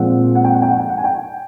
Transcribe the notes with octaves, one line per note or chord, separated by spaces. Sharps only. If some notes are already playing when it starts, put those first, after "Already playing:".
Already playing: A#2 F3 G#3 C4 F#5
F#5
G5
F#5
G5
F#5
G5
F#5
G#5
G5